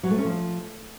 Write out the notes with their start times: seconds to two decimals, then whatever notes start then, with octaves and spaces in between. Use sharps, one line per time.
0.03 F#3
0.11 A3
0.18 C#4
0.25 F3